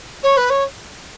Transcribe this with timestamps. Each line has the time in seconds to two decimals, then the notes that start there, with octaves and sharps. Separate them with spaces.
0.23 C#5
0.37 B4
0.50 C#5